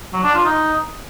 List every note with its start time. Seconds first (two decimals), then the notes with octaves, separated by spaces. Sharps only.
0.13 F#3
0.24 D4
0.34 F4
0.45 D#4